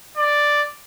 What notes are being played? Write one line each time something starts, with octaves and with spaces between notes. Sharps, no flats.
D5